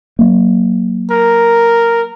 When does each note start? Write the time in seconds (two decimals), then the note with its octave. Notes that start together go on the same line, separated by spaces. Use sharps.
0.19 F#3 A#3
1.11 A#4